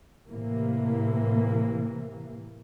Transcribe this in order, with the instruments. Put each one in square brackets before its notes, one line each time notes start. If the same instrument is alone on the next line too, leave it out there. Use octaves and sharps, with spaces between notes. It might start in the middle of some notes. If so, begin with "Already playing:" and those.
[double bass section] A2 C3 E3 A#3